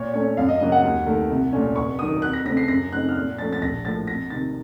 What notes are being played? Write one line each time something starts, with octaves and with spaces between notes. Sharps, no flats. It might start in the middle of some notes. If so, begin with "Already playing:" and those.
Already playing: A#2 C#5
A3 C#4 C#5
F#2 F5
D#5
C#3 F#3 A#3 D#5
F#5
D#2
D#3 A3
C2
A#2 A3 C#4
F1 C#6
F2 D#3 F#3 D#6
F2 F#6
A#6
C#3 A3 C4 A#6
C7
F#2 A#6
C#3 A3 C4 D#4 F#6
F6
A#2 F#6
F3 A3 C#4 A6
A6
A#1 A#6
A2 F3 A#3 A6
F2 A#6
C3 D#3 A6